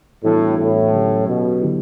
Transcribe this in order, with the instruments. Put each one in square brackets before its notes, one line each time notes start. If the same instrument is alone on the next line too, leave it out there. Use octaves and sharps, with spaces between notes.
[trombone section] A2 [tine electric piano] E3 G3 B3 D4 F#4
[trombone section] A2
[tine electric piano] D3 F#3 C#4 G4
[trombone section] B2
[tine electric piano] D3 F#3 B3 E4 G4